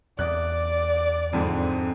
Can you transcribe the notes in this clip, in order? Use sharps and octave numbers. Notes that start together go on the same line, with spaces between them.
E2 D5 F#6
F2 G#2 D3 C4